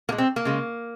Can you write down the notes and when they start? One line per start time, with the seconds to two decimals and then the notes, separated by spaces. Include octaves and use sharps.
0.09 A#2 A#3
0.12 G#3
0.18 C4
0.36 A#3
0.45 C#3 G#3